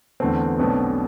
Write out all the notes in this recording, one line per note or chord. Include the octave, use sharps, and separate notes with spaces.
E2 D3 A3 B3 C4
B1 B2 A3 C4 D4